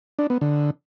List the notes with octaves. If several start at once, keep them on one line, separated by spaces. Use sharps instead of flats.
D4
B3
D3